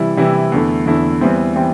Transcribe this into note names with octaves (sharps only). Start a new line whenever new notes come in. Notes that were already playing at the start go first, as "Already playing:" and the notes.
Already playing: C3 E3 G3 E4
C3 E3 G3 E4
E2 D3 A3 E4
E2 D3 A3 E4
E2 E3 G3 C4
E3 G3 C4